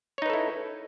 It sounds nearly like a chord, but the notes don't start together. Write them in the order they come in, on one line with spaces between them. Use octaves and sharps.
C#5 D#4 B4 A4 E4